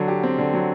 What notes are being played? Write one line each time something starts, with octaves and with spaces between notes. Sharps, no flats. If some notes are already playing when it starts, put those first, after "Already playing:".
Already playing: D3 F#3
G4
C4
D3
F#3